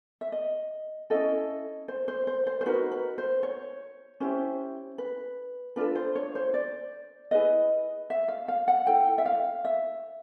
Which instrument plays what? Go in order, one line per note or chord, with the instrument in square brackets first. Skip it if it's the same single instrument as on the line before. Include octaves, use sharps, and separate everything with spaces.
[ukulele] E5
D#5
C#4 E4 A4 D#5
C5
C5
C5
C5
C5
D#4 F#4 A#4 B4
B4
C5
C#5
C#4 E4 G4 C5
B4
D4 F4 A4 B4
C5
C#5
C5
D5
E4 G#4 B4 D#5
E5
F5
F5
F#5
E4 A4 G5
E5
F5
E5